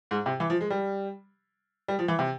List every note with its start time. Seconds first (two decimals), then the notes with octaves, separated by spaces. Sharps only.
0.11 G#2
0.26 C3
0.40 E3
0.50 F3
0.61 G#3
0.70 G3
1.88 G3
1.99 F3
2.08 E3
2.19 C3